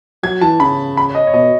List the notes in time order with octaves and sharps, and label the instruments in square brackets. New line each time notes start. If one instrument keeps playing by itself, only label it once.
[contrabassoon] F#3 [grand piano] G#6
[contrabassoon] E3 [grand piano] A5
[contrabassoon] C#3 [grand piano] B5
[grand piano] B5
C#5
D#5
C#5
[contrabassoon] B2 [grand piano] D#5